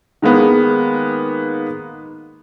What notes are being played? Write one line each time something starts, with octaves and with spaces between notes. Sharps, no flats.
D#3 G#3 A#3 B3